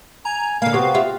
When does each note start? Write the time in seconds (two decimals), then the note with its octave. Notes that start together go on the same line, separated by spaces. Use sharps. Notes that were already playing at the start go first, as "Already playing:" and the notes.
0.25 G#5 A#5
0.62 D3 A#3 A#4 F5
0.74 C3 B3 C4 F#4 G4
0.94 F4 G4 E5